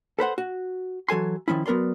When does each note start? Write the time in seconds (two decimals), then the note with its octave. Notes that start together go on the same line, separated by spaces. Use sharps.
0.19 A4 B4 C5 F#5
0.38 F#4
1.09 E3 F#3 A4 G#5 C6
1.48 D#3 F3 C#4 E4
1.66 F#3 B3 A#4 D5 C6